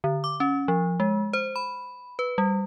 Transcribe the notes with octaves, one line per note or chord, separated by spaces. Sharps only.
D3
D6
C#4
F3
G#3
C5
B5
B4
G3